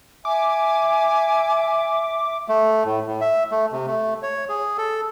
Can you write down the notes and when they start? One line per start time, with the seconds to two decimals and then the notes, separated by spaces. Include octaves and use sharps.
0.25 E5 G#5 D6
2.48 A3
2.85 A2
3.07 A2
3.21 E5
3.51 A3
3.72 C3
3.87 A3
4.23 C#5
4.49 G#4
4.78 A4